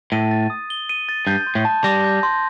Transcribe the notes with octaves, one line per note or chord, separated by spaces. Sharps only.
A2 D#7
A6
D#6
G7
D#7
A6
G2 G6
C6
A2
A5
G3 A#6
G6
C6